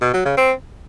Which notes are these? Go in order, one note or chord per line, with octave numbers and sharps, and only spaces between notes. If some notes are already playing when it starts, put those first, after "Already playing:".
B2
F#3
C#3
C4